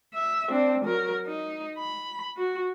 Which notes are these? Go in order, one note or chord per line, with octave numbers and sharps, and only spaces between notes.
E5
C4 D4
F#3 A#4
D#4
B5
F#4